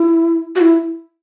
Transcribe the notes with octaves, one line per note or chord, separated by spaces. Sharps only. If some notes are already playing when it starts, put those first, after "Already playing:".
Already playing: E4
F#4
E4